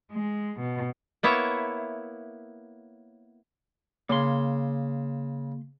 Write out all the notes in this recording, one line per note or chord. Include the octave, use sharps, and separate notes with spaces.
G#3
B2
A#3 B3 E4 C#5 E5
C#3 A#3 C6